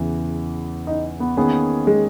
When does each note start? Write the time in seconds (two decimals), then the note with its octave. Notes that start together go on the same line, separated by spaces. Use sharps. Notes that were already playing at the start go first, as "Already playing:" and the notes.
Already playing: E2 C#3 E3
0.87 D#4
1.20 B3
1.37 D#3 A#3 B3 C#4 G#4
1.87 G#3